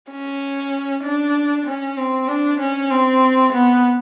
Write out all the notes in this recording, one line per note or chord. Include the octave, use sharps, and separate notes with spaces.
C#4
D4
C#4
C4
D4
C#4
C4
B3